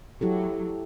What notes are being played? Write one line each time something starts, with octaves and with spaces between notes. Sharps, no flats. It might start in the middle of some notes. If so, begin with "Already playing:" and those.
F#3 E4 G4 A4